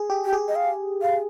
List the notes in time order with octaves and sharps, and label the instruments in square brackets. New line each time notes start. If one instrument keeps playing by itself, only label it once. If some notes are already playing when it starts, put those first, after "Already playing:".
Already playing: [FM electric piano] G#4
G4
[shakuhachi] G4
[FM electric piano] G#4
[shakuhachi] D#5
F5
F5